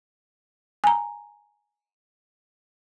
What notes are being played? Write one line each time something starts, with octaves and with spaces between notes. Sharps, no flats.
G#5 A#5